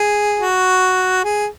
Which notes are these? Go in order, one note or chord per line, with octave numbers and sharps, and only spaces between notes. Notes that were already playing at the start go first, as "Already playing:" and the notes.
Already playing: G#4
F#4
G#4